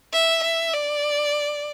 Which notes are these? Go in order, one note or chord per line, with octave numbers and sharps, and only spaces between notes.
E5
E5
D5